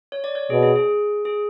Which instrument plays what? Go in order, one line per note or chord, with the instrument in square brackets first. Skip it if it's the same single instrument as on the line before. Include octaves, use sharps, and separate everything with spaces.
[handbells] C#5
D5
C#5
[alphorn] B2 [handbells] G#4
[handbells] G#4
G#4
G#4